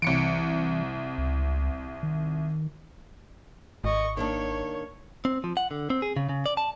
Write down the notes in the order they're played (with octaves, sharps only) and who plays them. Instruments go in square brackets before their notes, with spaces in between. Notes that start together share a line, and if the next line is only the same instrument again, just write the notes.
[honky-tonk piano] C2 C#7 D7 [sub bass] E3
[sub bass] C#2
D#3
[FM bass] G#1 [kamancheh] D#5 C#6
[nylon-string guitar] D#3 A#3 D4 [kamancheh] C#5
[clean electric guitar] C4
F3
F#5
D3
C4
G#4
C#3
C#3
D5
A5